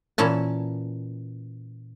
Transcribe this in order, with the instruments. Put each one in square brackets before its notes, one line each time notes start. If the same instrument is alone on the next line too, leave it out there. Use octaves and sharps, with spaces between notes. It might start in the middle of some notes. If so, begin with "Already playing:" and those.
[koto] A#2 E3 C#4 A5